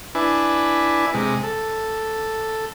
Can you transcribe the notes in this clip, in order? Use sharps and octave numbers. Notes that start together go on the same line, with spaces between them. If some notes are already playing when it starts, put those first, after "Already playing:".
D4 E4 B4 G#5
C3 G#3
A4